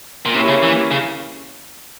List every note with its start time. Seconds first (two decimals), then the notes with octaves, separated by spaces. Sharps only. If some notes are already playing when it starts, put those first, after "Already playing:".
0.26 A#2
0.34 C3 A#3 C#4 E4 G4 C#5
0.48 C#3
0.63 E3
0.91 C#3